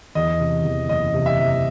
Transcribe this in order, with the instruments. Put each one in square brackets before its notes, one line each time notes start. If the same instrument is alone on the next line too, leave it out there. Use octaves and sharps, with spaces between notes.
[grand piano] E2 [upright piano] D#5
[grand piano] C3
E2
[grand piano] F#1 [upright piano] D#5
[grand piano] C3
[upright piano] E5
[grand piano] E2